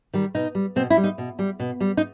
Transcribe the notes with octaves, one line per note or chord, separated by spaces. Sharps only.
D#3 G3
B2 D#4
G3
B2 C4
E4
G3
D#4
B2
G3
B2
G3
D#4